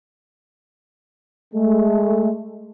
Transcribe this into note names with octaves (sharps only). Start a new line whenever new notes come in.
G#3 A3